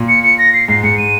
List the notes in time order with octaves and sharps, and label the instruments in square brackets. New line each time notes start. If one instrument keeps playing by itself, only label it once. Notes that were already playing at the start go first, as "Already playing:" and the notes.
Already playing: [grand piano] A#2
[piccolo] C#7
C#7
A#6
C7
[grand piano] G#2 [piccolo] C7
[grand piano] G#2 [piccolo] C#7
[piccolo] D#7